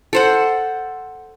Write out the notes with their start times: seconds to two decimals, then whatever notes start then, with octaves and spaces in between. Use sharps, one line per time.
0.13 A4 C5 F#5